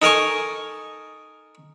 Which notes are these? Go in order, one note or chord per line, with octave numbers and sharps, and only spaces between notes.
D#4 A4 A#4 G#5 C#6